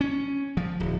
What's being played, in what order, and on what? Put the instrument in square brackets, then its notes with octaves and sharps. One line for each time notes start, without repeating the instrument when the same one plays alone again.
[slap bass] C#4
F3
D1